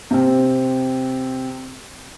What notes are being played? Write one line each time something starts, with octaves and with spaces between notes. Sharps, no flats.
C3 C4